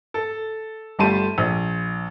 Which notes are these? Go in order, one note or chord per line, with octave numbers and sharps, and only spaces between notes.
A4
G1 G3 A3 A5 C6 D#7
A#1